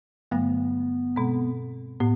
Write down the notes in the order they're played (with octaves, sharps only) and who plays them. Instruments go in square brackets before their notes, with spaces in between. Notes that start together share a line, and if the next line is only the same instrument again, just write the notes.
[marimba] G2 D3 F#3 A3 [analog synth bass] B3
[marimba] B2 G#3 C4
[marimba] A2 [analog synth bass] B3